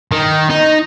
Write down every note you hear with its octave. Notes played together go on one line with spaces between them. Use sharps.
D#3
D#4